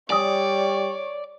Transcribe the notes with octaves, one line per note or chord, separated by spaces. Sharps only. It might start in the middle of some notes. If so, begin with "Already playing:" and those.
G3 C#5 D5 G#5 D#6